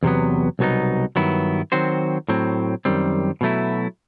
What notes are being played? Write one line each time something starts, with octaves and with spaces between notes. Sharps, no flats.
E2 C3 F#3 B3
C2 B2 F#3 B3 D#4
G2 D#3 F#3 B3 E4
D#3 F#3 C4 F#4 C5
A2 F#3 C4
F#2 D#3 G3 C4
B2 F#3 A3 E4